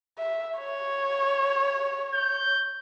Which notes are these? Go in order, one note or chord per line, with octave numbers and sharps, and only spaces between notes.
E5
C#5
G6